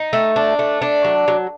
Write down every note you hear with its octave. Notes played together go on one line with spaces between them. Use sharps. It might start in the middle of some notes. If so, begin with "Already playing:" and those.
Already playing: D#4
A3
D4
A3
D4
F#3
F#3